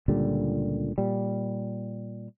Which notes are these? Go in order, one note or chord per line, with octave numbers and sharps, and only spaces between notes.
C#2 A#2 D3 G3
A#2 G3